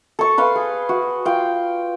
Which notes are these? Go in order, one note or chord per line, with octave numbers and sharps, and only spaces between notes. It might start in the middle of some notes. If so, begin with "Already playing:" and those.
A4 C#6
B4 F5 C6
G#4
F#4
F4 F5 G5